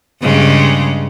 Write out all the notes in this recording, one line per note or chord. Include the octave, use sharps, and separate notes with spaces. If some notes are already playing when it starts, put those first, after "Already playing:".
G2 C#3 G#3